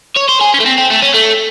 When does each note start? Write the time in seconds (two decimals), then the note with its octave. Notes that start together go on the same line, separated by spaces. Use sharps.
0.16 C#5
0.28 C5
0.41 G#4
0.54 C#4
0.60 A3
0.66 C4
0.78 C4
0.91 A3
1.03 C#4
1.14 A3